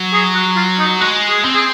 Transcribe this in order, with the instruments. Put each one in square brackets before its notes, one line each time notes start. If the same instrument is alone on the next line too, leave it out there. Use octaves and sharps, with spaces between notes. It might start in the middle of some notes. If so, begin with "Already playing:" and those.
Already playing: [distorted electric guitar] F#3
[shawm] G#4
F#4
F4
D#4
[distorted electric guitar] G#3 [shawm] F#4
[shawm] G#4
[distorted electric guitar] C4
[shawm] G#4